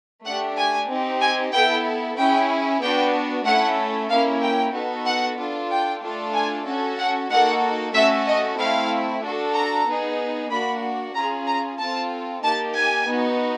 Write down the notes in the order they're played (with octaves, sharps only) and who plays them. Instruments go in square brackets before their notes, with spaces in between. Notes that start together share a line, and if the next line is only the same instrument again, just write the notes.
[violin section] A3 D4 G4 F#5
G#5
C4 D#4 G4
G#5
B3 E4 A4 G5
C#4 E4 G#4 G5
B3 D4 F#4 G5
A3 C#4 E4 A4 F#5
A#3 C#4 E4 F5
G5
B3 D#4 F#4 A4
F#5
D4 F4 A4
G5
A3 D4 F4 A4
G#5
C#4 F#4 A4
F#5
A#3 D#4 F#4 A4 F#5
A3 C#4 F#4 A4 E5
D#5
A3 C4 E4 F5
D4 F#4 A4
A#5
B3 D#4 G#4
A#3 D4 F#4 B5
C#4 F4 G#4 A#5
A#5
C4 F4 A4 A5
A#3 D#4 G4 A5
G#5
B3 D#4 F#4